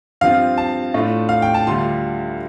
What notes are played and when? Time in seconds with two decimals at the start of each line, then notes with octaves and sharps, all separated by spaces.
0.21 G2 F3 C4 F4 F5
0.58 A5
0.94 A2 A3 D4 F4
1.29 F5
1.42 G5
1.54 A5
1.67 D2 D3 G3 F4 C6